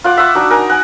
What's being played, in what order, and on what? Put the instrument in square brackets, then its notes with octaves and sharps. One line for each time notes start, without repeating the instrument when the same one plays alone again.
[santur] F4 F#5 D6
E5 F#5 C#6 D6
D4 D#4 F#4
D#4 A#4 G#5
F#5 G#5